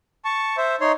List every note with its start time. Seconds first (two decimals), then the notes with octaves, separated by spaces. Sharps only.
0.25 A5 C#6
0.57 C5 E5
0.81 D#4 C#5 C6